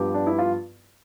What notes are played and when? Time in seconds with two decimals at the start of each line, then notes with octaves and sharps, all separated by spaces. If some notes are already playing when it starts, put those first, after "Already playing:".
Already playing: G2 F3 B3 G4
0.14 D4
0.27 E4
0.38 F4